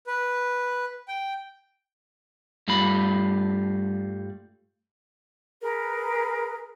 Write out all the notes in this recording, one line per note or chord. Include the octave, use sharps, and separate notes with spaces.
B4
G5
G2 G3 A3 F4 B5
G#4 A#4 B4